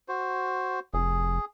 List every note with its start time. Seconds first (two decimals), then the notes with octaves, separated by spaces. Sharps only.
0.08 F#4 C5
0.94 F1 G#4